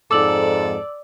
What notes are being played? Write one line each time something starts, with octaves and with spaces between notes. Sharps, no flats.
F2 G#2 A4 D5 D6 E6 F#7